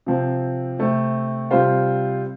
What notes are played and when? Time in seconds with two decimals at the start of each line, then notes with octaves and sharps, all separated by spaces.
0.06 C3 F3 C4
0.79 C3 A3 C4
1.51 C3 G3 F4 C5